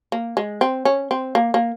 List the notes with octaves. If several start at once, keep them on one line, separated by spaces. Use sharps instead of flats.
A#3
G#3
C4
C#4
C4
A#3
A#3